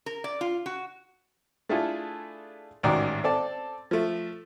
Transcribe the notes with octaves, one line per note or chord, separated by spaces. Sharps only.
A#4
D5
F4
F#4
A3 D4 E4 F4 G#4 A4
A1 G#2 D#3 F#4 D5
C4 A4 D5 A5
F3 A3